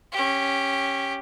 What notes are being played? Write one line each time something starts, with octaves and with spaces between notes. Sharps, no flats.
C#4 G4